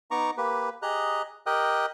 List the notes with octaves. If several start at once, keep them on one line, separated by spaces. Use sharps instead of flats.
B3 D#4 A#5 C#6 D6
A#3 G4 B4
G4 G#4 D#5 A#5 F#6
G4 A#4 D#5 G5 D#6 F#6